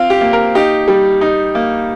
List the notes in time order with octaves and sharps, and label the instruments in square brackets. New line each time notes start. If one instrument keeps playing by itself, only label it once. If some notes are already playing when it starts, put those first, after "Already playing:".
Already playing: [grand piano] C4 F4 F5
G4
A#3
A#4
D#4 G4
G3
D#4
A#3